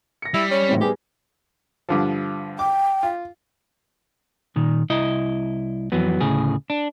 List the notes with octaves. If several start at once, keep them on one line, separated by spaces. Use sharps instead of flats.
A#6 C#7
G3 E4
C#4
G#1 A2 C4
G3 B3 G4 G#4
G2 D3 F3
G5 D6
F4
A#2 D#3
C2 E4 D#5
F2 E3 F#3 B3
D2 A2 C#3 G#4
D4